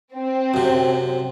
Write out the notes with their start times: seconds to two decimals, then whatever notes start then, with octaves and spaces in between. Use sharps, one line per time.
0.15 C4
0.54 F#2 C3